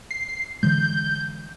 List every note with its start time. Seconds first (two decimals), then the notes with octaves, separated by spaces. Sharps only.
0.11 C7
0.63 D3 E3 G#3 G6